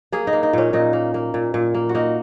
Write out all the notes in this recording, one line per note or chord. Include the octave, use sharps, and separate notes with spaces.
A#3 G#4
D#4
A#3
D#4
A#2 C#4
A#2 D#4
A#3
A#3
A#2
A#2
A#3
F#4
A#3 D#4